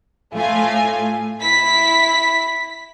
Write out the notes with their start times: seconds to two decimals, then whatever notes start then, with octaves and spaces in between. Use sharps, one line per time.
0.35 A2 A3 F4 G#5
1.41 E4 B6